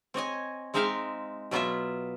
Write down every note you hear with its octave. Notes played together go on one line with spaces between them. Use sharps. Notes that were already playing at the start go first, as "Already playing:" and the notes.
C4 C#5 D#5 G#5
G#3 C4 D#4 E5 F5 G5
B2 F#3 B3 F4 E5